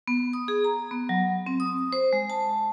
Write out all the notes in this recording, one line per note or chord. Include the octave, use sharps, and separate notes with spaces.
B3
D#6
G#4
A#5
B3
F#3
C4
D#6
C5
G#3
A5